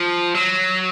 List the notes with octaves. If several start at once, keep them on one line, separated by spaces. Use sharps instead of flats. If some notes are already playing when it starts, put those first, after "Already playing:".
Already playing: F3
F#3